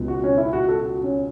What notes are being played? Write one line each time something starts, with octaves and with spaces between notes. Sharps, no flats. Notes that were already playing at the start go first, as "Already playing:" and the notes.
Already playing: C#2 B2 F#3
F#4
C#4
E4
F#4
A4
F#4
C#4